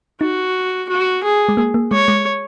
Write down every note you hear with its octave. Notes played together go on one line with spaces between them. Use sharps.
D#4 F#4
F#4
G#4
G#3
A#3
A#3
G#3 C#5
G#3